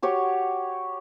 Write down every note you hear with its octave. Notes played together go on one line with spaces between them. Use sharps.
F#4 G4 C#5